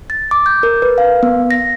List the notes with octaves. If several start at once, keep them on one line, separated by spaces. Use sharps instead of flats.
A6
D6
G6
A#4
B4
F5
B3
A#6